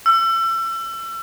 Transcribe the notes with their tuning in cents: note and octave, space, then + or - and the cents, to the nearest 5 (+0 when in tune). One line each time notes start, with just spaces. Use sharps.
E6 +30